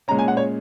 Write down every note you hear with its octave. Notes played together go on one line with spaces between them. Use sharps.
A#2 G#3 C#4 A#5
G#5
F#5
C#5